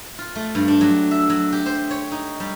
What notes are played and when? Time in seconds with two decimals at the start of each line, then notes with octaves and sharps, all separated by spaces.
0.18 F4
0.36 A3
0.55 G2
0.68 D4
0.81 F#3
1.11 E5
1.30 F#3
1.52 G4
1.66 C5
1.91 C#5
2.12 D#4
2.40 G3